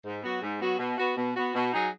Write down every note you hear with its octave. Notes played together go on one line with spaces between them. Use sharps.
G#2
F#3 B3 F#4
G#2
F#3 B3 F#4
B2
B3 F#4
B2
B3 F#4
B2
F#3 D#4 G#4